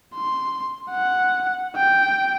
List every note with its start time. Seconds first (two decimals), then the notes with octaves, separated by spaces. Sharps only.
0.15 C6
0.90 F#5
1.76 G5